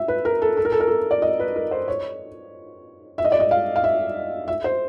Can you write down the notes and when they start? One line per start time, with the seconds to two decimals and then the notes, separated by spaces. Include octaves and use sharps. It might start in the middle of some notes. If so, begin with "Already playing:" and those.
Already playing: E5
0.08 B4
0.25 A#4
0.42 A4
0.57 A4
0.65 A#4
0.72 A4
0.80 A#4
0.87 A4
1.11 D5
1.22 D#5
1.40 B4
1.56 A#4
1.71 C5
1.88 C#5
3.18 E5
3.25 D#5
3.32 D5
3.40 D#5
3.51 F5
3.76 F5
3.84 E5
4.48 E5
4.64 C5